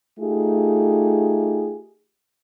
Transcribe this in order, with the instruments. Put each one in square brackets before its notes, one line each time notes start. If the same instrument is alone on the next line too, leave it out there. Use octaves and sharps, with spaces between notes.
[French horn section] A3 D#4 F4 G4 G#4